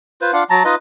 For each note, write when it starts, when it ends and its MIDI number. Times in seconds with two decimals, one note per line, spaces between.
0.21 0.32 65
0.21 0.32 71
0.21 0.32 72
0.33 0.44 62
0.33 0.44 65
0.33 0.44 77
0.33 0.44 78
0.50 0.63 54
0.50 0.63 81
0.50 0.63 82
0.65 0.75 63
0.65 0.75 65
0.65 0.75 71
0.65 0.75 75